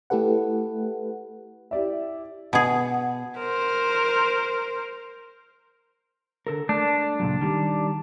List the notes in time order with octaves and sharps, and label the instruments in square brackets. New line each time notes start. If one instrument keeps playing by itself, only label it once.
[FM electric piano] A3 E4 G4 A4 B4 F#5
[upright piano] E4 G4 D5 E5
[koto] B2 G#4 [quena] F#5
[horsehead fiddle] A#4 C5
[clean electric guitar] D3 A4 A#4
[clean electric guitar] A3 [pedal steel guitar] D4
[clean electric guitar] C#2 A#2 F#3
D#3 G3